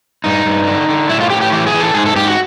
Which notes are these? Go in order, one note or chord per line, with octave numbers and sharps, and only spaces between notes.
G2 D#4
G2
D3
D3
A2 E4
F4
A2 G4
G4
E3 G4
G#4
E3
A4
G#2 G#4
A4
G#2 G4
F#4